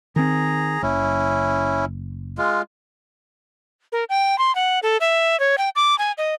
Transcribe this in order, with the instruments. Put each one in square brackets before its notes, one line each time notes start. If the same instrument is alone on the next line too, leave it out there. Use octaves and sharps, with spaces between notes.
[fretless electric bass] D#3 C4 [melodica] G#4 A#5
[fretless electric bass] F#1 [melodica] C#4 E4
[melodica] G#3 F4
[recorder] A#4
G5
C6
F#5
A4
E5
C#5
G5
D6
G#5
D#5